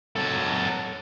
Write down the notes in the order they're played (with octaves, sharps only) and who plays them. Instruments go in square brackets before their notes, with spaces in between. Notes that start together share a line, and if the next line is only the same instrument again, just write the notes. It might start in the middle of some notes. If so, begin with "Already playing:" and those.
[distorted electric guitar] F#3 A4